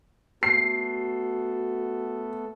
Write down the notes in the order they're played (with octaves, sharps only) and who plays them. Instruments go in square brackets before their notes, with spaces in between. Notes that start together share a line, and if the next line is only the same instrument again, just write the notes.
[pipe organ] A3 B3 A4 [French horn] F#4 [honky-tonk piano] C7